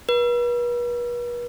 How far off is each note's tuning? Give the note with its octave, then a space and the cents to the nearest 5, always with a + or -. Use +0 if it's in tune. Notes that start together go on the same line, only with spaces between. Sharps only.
B4 -40